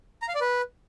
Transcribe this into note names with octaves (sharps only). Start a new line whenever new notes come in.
A#5
F5
D5
B4